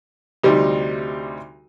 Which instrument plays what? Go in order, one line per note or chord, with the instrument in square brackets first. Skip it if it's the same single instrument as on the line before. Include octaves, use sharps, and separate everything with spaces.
[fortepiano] D2 C3 G3 D#4